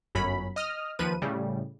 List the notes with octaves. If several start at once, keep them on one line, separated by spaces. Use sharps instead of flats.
G1 F#2 F#3 C#4 B5
D#5 D#6 F6
D#2 F3 B4 D#7
A2 C#3 G3